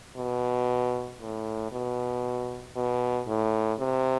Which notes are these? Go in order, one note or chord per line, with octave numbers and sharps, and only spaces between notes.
B2
A2
B2
B2
A2
C3